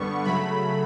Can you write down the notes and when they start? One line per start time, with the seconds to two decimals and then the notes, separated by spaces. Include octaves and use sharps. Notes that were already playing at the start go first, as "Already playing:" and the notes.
Already playing: G2 D3 G3 B3 C#6
0.24 C#3 F#3 A3 B5